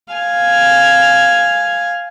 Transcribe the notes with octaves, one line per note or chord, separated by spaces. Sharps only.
F5 G#5